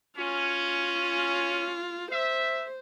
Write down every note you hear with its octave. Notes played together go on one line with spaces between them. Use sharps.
C#4 F4
C5 E5